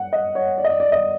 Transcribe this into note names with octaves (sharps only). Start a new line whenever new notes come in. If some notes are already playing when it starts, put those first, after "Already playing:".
Already playing: F#5
D#5
C#5
D5
D#5
D5
D5
D#5